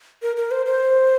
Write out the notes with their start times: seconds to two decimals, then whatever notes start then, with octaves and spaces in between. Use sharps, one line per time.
0.22 A#4
0.36 A#4
0.51 C5
0.66 C5